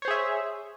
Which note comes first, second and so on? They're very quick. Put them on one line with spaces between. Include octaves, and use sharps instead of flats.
C#5 C5 G#4 E5